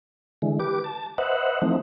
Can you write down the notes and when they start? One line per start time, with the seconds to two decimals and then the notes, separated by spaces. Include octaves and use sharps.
0.42 D3 E3 G#3
0.60 G4 B4 D6
0.84 A5
1.18 B4 C5 D#5 E5 F#5
1.62 E3 F3 A3 C4 D#4